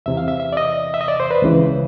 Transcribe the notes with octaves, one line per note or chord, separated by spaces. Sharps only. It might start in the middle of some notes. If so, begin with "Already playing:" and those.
E2 C3 E3 E5
F5
E5
E5
D5
D#5
E5
D#5
D5
C5
B4
C#2 C#3 E3